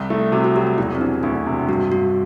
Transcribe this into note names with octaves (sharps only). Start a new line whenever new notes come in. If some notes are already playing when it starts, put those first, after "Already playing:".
Already playing: C2
A3 E4
C3 F#4
F#4
F#3 G4
F#4
E1 E4
C4
E3 D4
D2 D4
C3
G2 F#4
G2 F#4